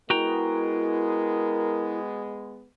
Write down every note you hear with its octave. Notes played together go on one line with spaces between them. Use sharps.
G#3 B3 E4 F#4 A#4 G5 A#5